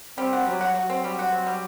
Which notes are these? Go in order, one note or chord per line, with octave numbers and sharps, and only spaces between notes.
G3 C4
F#4
F#3 G3
F#4
F#3 F#4
C4
G3
F#4
C4
G3